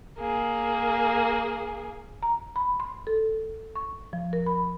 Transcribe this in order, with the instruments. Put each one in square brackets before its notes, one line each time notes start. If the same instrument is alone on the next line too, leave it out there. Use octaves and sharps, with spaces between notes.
[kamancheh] A#3 G#4
[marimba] A#5
B5
C6
A4
C#6
F3
A#4
B5